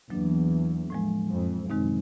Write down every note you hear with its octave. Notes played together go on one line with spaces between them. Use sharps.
E2 F#3 A#3 D4
A2 F3 G#3
F2
F#2 C3 D#3 G#3 C4 D#4